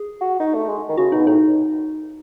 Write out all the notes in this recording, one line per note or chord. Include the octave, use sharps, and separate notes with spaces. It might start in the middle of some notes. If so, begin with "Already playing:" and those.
Already playing: G#4
F#4
D#4
A3
G#3
D#3
C#3 F#4
B2 D#4
A2 D#4